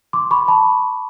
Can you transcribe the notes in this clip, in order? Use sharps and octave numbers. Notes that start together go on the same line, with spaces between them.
C6 D6
B5 C#6
A5 B5